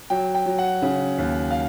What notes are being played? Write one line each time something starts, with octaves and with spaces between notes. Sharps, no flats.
F#3 G5
G5
F#3
F#5
C#3
D#2
F5